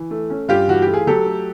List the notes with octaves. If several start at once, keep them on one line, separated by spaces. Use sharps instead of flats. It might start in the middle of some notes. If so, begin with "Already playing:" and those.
Already playing: E3
A3
C#4
G2 F4 G4
E3 F#4
A3 G4
G#4
F#3 G4 A4
A3